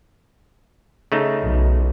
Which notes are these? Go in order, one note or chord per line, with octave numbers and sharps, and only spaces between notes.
C#3 A3 D#4
B1